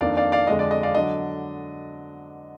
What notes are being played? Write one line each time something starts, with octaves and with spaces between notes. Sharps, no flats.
F2 D#3 A#3 D4 D5 F5
D5 F5
D5 F5
F2 D3 G#3 D4 D#5
D5
D#5
D5 F5
D3 F#3 D4 D#5